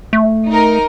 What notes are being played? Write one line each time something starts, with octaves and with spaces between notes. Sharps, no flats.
A3
D#4 A#4